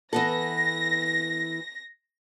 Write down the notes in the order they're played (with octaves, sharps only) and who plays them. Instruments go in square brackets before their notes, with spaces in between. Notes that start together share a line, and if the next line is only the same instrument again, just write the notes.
[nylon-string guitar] E3 B3 A4 [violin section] A#6